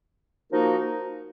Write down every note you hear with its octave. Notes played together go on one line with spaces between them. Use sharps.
F3 A#3 D#4 F#4 A#4